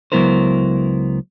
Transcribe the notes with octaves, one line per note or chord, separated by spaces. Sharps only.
C#2 F#3 B3 E4 A#4 C5